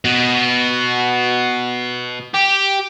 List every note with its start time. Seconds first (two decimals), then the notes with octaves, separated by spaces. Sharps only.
0.05 B2 B3
2.34 G4